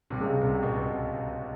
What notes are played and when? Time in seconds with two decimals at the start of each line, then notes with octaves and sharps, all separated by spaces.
0.10 C2 C3
0.20 C#2 C#3
0.41 C2 C3
0.63 B2
0.77 B2